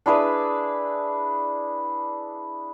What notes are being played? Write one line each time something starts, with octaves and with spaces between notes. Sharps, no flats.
D4 E4 G#4 B4